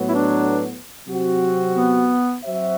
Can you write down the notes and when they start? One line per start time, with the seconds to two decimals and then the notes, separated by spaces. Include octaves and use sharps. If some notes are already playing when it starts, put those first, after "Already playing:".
Already playing: A2 F#3 B3
0.08 E4
0.14 D4
1.06 C3 F#3 C4 F#4
1.76 B3
2.43 F#3 C4 F#4 C5 E5